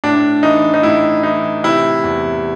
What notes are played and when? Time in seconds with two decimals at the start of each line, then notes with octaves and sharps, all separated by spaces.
0.04 A2 D4
0.43 E3 D#4
0.74 D#4
0.83 A2 E4
1.23 E3 D#4
1.64 C3 E4
2.04 E2